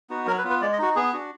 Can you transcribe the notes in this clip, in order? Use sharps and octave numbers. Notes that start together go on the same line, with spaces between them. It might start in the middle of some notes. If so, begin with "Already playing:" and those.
B3 D#4 F#4
F#3 A#4
B4
B3 F4
B4
G#3 D5
D#5
D#4 F#4
B3 G#4
D4 F#4